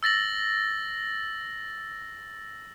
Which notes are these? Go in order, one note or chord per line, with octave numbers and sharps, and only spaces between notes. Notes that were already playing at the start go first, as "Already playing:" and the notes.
E6 A6 A#6 F#7